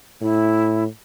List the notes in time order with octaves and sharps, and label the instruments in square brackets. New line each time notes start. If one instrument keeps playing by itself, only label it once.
[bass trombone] A2 [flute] E4